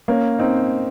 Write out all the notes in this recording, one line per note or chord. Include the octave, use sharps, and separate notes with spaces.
A#3 C#4
C4 D#4